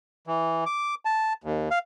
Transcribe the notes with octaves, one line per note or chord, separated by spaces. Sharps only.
E3
D6
A5
D#2
F5